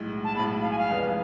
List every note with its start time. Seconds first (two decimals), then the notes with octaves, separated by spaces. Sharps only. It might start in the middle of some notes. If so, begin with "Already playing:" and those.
Already playing: B1 A2 G#3
0.24 A5
0.35 B1 A2 G#3 B5
0.62 F5
0.71 G#5
0.78 F5
0.91 F1 F2 E3 G#3 B3